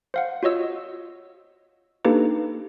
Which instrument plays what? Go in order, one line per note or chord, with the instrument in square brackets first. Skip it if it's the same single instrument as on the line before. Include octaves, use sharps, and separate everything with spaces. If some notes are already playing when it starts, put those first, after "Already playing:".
[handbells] C5 F5 F#5
F4 F#4 C#5 D#5 E6
A#3 D4 D#4 G4 A4 B4